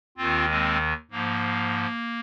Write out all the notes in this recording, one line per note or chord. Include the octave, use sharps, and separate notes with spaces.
D#2 D#3 C4 F4
G#3 C4
G#2 F3 A#3